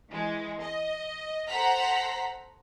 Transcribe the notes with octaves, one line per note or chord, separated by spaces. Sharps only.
E3 G#3
D#5
A4 C5 F#5 A#5 B6